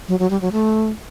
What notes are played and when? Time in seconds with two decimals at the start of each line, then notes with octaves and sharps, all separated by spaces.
0.08 F#3
0.19 F#3
0.30 G3
0.41 F#3
0.52 A3